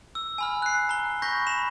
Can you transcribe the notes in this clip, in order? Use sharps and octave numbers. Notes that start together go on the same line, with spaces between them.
E6
G#5 B5 F6
F#6 C7
A#5 G7
B5 C#6 G6 A#6 B6
B5 E7